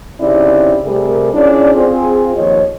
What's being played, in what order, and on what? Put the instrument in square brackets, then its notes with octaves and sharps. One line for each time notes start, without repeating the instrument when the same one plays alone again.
[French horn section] C#3 C4 D#4 E4 G4 D5
C3 G3 A3 G#4 A#4
C#4 D4 E4 F4 G#4 D5
C4 F4 G#4
D#2 F3 C#5 D#5